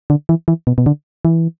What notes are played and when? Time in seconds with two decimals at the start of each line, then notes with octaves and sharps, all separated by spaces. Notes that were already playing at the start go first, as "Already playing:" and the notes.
0.10 D3
0.29 E3
0.48 E3
0.67 B2
0.78 B2
0.86 D3
1.25 E3